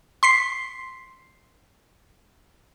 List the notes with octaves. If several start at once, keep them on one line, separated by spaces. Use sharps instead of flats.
C6 B6 C7